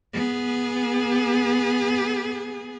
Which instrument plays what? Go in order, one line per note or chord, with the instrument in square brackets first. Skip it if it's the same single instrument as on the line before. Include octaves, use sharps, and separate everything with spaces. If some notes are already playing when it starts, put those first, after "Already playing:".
[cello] B3 G#4